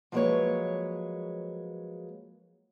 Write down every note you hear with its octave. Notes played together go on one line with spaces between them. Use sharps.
F3 F#3 G#3 A#3 B4 C#5